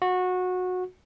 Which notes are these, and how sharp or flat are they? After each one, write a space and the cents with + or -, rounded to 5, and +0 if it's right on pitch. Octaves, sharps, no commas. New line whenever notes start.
F#4 -20